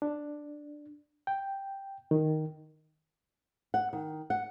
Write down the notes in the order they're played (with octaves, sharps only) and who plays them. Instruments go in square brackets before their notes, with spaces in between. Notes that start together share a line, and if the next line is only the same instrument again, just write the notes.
[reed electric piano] D4
G5
D#3
[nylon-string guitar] F#5
D#3
F#5